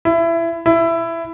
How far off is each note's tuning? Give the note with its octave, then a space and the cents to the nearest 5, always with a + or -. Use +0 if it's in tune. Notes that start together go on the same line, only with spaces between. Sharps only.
E4 +20
E4 +15